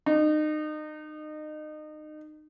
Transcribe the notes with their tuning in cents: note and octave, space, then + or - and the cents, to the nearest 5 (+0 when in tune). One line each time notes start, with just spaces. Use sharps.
D#4 -30